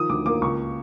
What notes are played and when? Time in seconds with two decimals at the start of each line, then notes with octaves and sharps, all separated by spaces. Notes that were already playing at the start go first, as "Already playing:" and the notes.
Already playing: D#3 F3 D#6
0.09 D2 D6
0.26 A#3 D6
0.42 C#2 C#6